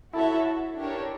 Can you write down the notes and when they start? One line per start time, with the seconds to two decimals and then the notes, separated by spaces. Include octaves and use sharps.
0.13 E4 F#4 A4 C#5 E5
0.78 D4 G4 A#4 C#5